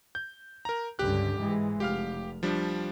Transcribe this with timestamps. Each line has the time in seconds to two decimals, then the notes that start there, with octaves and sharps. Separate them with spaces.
0.15 G6
0.65 A#4 A#5
0.99 C#2 G2 D3 G4 F#6
1.36 G#2 E3 G#3
1.80 F1 G4 F5 F6
2.43 F3 G3 D4